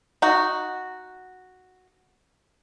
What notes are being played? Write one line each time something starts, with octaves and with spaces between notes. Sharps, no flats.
D#4 F#4